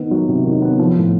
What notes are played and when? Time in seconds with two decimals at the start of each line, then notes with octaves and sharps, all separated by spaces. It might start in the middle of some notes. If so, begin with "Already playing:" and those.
Already playing: D#3 B3
0.11 F#3
0.28 C3
0.45 D#3
0.62 B3
0.79 F3
0.96 A2